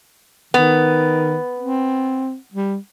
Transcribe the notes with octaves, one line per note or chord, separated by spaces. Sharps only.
D#3 B3
C4
G3